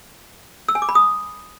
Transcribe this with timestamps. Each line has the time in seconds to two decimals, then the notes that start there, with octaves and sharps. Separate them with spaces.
0.69 E6
0.75 G#5
0.82 D6
0.89 B5
0.95 D#6